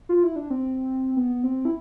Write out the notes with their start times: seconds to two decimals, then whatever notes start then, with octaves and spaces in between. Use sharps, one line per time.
0.09 F4
0.23 E4
0.36 D4
0.50 C4
1.17 B3
1.44 C4
1.65 E4